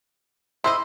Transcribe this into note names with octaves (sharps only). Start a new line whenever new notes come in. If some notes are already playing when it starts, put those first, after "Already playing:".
E4 C5 D#5 C6 E6